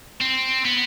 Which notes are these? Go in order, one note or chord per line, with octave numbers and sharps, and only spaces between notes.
C4
B3